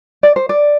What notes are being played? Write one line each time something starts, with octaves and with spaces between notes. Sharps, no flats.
D5
C5
D5